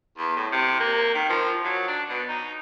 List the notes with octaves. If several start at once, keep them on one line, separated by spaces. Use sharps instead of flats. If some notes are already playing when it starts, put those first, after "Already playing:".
E2
A2
C3
A#3
D#3
F3
F#3
D4
B2
D#4